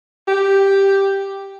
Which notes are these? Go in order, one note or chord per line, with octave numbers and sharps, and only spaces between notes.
G4